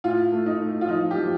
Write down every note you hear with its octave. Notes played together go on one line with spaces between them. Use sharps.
A2 F4
A3
D#4
A3
F4
F3 D#4
G4
F3